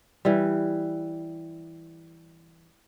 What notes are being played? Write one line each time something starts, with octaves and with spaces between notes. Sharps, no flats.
E3 G3